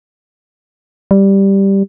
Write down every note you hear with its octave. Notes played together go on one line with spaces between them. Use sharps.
G3